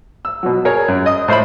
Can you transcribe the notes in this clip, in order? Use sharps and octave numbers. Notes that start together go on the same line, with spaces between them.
E6
B2 F#3
G#4 A#4 C#5
F#2
D#5 D#6
A2 C5 E5 B5